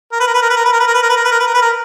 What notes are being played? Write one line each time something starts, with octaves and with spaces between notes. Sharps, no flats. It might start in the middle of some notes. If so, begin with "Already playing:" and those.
A#4
B4
A#4
B4
A#4
B4
A#4
B4
A#4
B4
A#4
B4
A#4
B4
A#4
B4
A#4
B4
A#4
B4
A#4